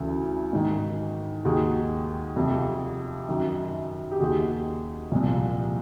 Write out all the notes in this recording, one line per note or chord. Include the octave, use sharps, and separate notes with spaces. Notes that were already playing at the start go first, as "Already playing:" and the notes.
Already playing: D2 C#3 E3
G#2 D#3
D#2 D#3 F#4 G#4
F2 C3 F3
F#2 D#3
G4
D#2 D#3 F#4 G#4
C2 A#2 F3